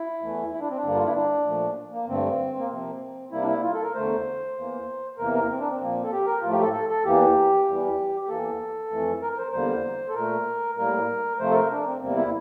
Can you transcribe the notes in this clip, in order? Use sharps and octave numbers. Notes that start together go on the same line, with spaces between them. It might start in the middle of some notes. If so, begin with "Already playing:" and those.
Already playing: E4
E2 E3 A3
E4
D4
C4
D4
G2 D3 G3 A#3
F4
E4
D4
A#2 F3 A3
A#3
G2 D3 A3 C4
A#3
C3 F3 A#3 C4
C3 G3 A#3 E4
D4
E4
F4
A4
A#4
E2 D3 A3 C5
E2 E3 A#3
E2 C3 E3 A#3 A#4
A#4
C4
D4
C4
A#2 F3 A#3
A4
G4
A#4
A2 F3 A3 F4
G4
A4
A4
A4
E2 E3 A#3 G4
E2 E3 G3
G4
E2 E3 A#3 A4
F2 E3 A3
A#4
A#4
C5
E2 D3 G3 A#3 C5
A4
A#2 A3 A#4
A2 G3 A#3 A#4
C3 F3 A3 C5
A4
A#4
D4
C4
E2 C3 G3 A#3 C4
E4